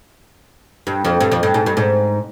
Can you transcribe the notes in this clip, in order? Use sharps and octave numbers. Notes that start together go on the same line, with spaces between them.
G2
F2
G2
F2
G2
G#2
G2
G#2